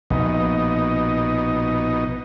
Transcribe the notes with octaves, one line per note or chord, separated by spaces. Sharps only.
A#1 B2 D#4